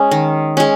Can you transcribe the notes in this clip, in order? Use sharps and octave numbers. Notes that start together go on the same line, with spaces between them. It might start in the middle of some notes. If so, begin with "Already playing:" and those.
Already playing: G#3 C#4
D#3
G#3 C#4